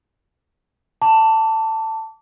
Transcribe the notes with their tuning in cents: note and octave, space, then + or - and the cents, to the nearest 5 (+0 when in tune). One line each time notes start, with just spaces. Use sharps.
A5 +15 D6 -30